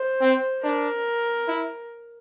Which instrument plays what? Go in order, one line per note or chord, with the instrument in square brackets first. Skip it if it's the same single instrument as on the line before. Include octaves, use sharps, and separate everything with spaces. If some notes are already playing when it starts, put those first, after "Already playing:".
Already playing: [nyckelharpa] C5
[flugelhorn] C4
[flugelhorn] D4 [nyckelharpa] A#4
[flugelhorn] E4